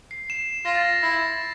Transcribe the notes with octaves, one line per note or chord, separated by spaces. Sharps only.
C7
E7
F4 A#6
A6
A#6
E4